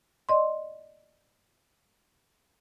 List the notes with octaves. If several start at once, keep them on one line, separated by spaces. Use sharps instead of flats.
D5 D#5 C6